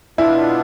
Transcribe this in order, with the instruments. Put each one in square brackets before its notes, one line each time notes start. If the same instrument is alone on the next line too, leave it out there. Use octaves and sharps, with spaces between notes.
[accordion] B2 B3 D4 F4 [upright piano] E4